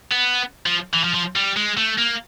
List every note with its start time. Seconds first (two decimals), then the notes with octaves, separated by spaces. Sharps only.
0.11 B3
0.66 F3
0.94 E3
1.04 F3
1.14 F3
1.36 G3
1.57 G#3
1.78 A3
1.98 A#3